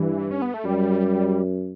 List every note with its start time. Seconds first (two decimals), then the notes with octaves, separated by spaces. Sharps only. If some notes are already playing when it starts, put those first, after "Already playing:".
Already playing: G2 E3
0.31 C#4
0.42 B3
0.54 A3
0.65 F#2 G3